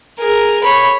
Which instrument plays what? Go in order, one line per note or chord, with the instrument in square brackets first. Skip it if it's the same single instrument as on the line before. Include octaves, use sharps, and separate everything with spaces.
[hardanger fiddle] G#4 A#4
C#5 B5